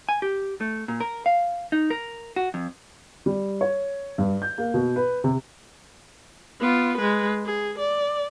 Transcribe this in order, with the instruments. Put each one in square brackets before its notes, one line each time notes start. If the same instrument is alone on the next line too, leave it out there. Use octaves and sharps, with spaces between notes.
[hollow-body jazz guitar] G#5
G4
A3
A#2
A#4
F5
D#4
A#4
F#4
F2
[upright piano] G3
C#5
G2
G6
A#3
B2
B4
C3
[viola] B3 F4
G#3 B4
G#4
D5